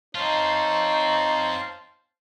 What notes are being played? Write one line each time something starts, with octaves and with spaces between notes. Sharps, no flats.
C4 D#4 F4 C5 C#5 F5 A5